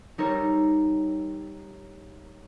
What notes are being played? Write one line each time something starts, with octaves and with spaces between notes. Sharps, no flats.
G3 D#4 A4 A#4 C#5